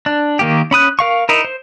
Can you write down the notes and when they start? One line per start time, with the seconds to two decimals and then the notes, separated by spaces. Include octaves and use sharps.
0.06 D4
0.39 D#3 A#3 G4
0.71 C#4 B5 D#6 F#6
0.99 A#4 F5 C#6
1.29 D#4 E4 A#4
1.44 C5